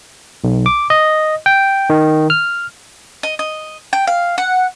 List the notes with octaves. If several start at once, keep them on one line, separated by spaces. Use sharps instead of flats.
B1
D6
D#5
G5
D#3
F6
D#5
D#5
G5
F5
F#5